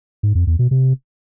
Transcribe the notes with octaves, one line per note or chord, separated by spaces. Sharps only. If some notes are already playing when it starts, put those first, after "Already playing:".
G#2
F2
E2
B2
C3